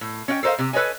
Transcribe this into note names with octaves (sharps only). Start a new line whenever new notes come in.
A2
C#4 D#5 F5 G5
A4 A#4 C5 D#5 F5
C3 G4
A4 B4 C#5 D#5 G#5